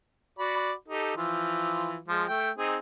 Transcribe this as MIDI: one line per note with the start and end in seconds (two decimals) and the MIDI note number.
0.39 0.73 66
0.39 0.73 74
0.39 0.73 83
0.88 1.15 63
0.88 1.15 67
0.88 1.15 69
1.17 1.97 52
1.17 1.97 53
1.17 1.97 65
2.08 2.24 53
2.08 2.24 56
2.28 2.51 57
2.28 2.51 79
2.58 2.77 60
2.58 2.77 63
2.58 2.77 68